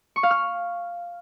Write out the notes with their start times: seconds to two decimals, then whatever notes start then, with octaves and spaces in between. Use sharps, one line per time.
0.16 C#6
0.23 F5
0.31 F6